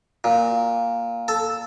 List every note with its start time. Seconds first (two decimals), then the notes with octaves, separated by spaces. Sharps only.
0.24 A#2
1.28 A4